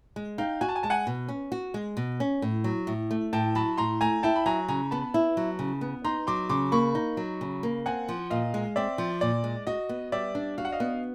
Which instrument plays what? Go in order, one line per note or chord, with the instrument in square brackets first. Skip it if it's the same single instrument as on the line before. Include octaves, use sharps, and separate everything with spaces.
[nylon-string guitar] G#3
[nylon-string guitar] D#4 [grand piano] F5 G5
[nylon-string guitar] F#4 [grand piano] G#5
[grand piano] A5
G#5
[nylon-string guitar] G#3 [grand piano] A5
[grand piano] F#5 G#5
[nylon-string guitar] B2
C#4
F#4
G#3
B2
C#4
A2
F#3
A2
A3
[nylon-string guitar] A2 [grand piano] G5 A5
[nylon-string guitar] F#3 [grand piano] A5 B5
[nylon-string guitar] A2 [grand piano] A#5 C6
[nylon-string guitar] A3 [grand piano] G#5 A#5
[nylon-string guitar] E4 [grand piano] G5 A5
[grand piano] B5
[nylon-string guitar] F#3 [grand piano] G#5 A#5
[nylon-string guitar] C#3 [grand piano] G#5 A#5
[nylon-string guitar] B3 [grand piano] A5 B5
[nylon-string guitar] E4
F#3
C#3
B3
[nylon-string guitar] D#4 [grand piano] A#5 C6
[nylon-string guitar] F#3 [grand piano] C6 D6
[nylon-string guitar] C#3 [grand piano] C6 D6
[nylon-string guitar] A#3 [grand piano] B5 C#6
[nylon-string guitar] D#4
F#3
C#3
A#3
[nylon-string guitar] C4 [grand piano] F#5 G#5
[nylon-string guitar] F3
[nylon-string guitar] A#2 [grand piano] D#5 F5
[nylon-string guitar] G#3
[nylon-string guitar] C4 [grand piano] D5 E5
[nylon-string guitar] F3
[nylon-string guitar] A#2 [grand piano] D5
[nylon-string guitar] G#3
[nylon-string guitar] F#4 [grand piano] D#5
[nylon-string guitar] B3
[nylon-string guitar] G3 [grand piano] D5 E5
[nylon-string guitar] D4
[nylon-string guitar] F#4 [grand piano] F5
[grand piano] F#5
D#5 F5
[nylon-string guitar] B3